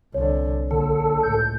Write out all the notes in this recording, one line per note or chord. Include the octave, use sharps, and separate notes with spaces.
C2 D3 C#5
A#1 A#2 D3 A4
C#2 A2 G6